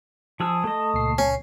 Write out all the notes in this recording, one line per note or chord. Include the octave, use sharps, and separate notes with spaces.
F3 G#4 A5 E6
A3 D#5
C#2 A#2 C7
C#4